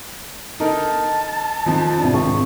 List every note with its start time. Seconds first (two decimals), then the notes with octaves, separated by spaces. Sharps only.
0.60 D3 D#4 A#4 A5
1.66 F2 D#3 F3
1.99 C2 D4
2.14 G#1 C#6